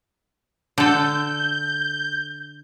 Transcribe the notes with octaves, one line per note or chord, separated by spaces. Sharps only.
D3 A4 G6